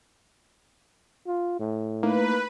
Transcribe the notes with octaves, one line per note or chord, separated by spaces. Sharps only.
F4
A2
A3 A#3 D#4 E4 B4